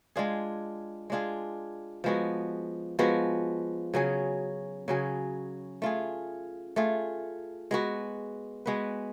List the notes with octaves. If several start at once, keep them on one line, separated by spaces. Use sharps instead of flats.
G#3 D4 F4 G#4
G#3 D4 F4 G#4
F3 G#3 B3 F#4
F3 G#3 B3 F#4
C#3 F#3 C#4 G#4
C#3 F#3 C#4 G#4
A3 F4 G#4
A3 F4 G#4
G#3 B3 F#4 B4
G#3 B3 F#4 B4